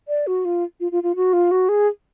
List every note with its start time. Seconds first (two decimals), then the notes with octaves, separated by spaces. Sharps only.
0.08 D5
0.27 F#4
0.45 F4
0.80 F4
0.92 F4
1.03 F4
1.16 F#4
1.33 F4
1.51 F#4
1.69 G#4